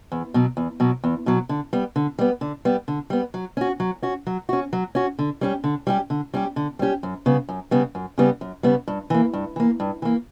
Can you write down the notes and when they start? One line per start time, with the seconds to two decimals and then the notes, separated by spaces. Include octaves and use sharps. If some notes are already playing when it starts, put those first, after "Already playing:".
0.12 E2
0.34 B2 F#3
0.57 E2
0.80 B2 F#3
1.04 E2
1.26 B2 F#3
1.49 D3
1.73 G3 B3
1.96 D3
2.19 G3 B3
2.41 D3
2.65 G3 B3
2.88 D3
3.10 G3 B3
3.34 F#3
3.57 C#4 F#4
3.80 F#3
4.02 C#4 F#4
4.27 F#3
4.49 C#4 F#4
4.73 F#3
4.95 C#4 F#4
5.19 D3
5.41 G3 C#4 G4
5.64 D3
5.87 G3 C#4 G4
6.10 D3
6.34 G3 C#4 G4
6.56 D3
6.79 G3 C#4 G4
7.03 F#2
7.26 C#3 G3 B3
7.49 F#2
7.71 C#3 G3 B3
7.95 F#2
8.18 C#3 G3 B3
8.41 F#2
8.63 C#3 G3 B3
8.88 G2
9.10 E3 A#3
9.33 G2
9.56 E3 A#3
9.80 G2
10.02 E3 A#3